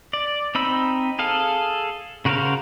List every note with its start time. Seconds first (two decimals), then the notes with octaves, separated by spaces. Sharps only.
0.13 D5
0.55 C4 D#4 B5 E6
1.19 G#4 A4 F5
2.25 C#3 F#4 A#4 C5 F5